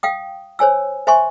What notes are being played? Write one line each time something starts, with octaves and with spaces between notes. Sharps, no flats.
F5 G5 D#6
C5 C#5 G#5 E6
C5 E5 G#5 C6 C#6